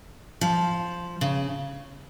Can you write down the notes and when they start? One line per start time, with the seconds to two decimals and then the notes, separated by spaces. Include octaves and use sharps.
0.41 F3
1.21 C#3